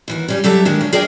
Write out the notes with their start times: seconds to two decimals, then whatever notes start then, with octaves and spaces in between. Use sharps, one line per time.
0.08 D#2 E3 F#4
0.28 G3 C#4
0.44 F#3 G4 A4 E5 A#5
0.65 D#3 G#3 A#3 D4
0.81 C#4
0.93 G#4 A#4 D5 D#5 G5